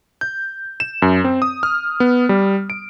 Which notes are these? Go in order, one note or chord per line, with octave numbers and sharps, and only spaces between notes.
G6
E7
F#2
C4
D#6
F6
B3
G3
D7